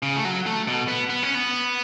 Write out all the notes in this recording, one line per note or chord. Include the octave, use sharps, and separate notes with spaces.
C#3
A3
F#3
A3
B2
B3
B3
C#4
B3